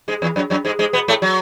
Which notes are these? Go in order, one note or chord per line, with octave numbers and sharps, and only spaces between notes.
G#2 G#3
E2 E3
F#2 F#3
F#2 F#3
G#2 G#3
G#2 G#3
B2 B3
A2 A3
F#3